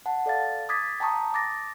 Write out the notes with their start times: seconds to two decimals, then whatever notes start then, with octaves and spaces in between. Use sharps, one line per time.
0.06 F#5 A5
0.26 A4 D5 F5 A6
0.69 D6 D#6 G#6 A6 B6
1.00 G5 A5 A#5 C#6 D#6
1.34 D6 A6 A#6